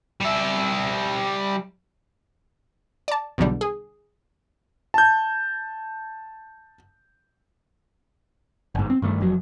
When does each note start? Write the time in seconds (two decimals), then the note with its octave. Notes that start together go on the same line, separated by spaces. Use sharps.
0.20 G3 E5
3.08 D5 A5
3.38 B1 E2 D3 G3
3.61 G#4
4.94 A5 G6
8.75 G1 G#2
8.90 C4
9.02 G2 D#3 A3
9.21 F1 F2 F#3